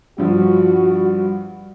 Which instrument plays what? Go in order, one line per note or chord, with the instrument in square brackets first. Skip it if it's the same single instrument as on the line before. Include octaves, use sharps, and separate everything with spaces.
[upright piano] G2 F3 [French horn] F#4